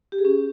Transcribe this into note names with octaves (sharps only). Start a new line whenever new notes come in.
G4
G#4
C#4